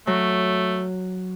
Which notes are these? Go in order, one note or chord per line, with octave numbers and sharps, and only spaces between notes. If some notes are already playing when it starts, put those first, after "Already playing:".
F#3 A3